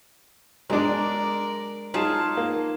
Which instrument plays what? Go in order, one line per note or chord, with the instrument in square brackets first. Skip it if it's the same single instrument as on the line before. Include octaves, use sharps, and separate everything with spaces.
[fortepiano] F#3 D4 [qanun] G#3 [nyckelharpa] A#4 D5
[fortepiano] F#3 [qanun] D#4 F4 G#4 [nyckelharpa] A5
[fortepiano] A#3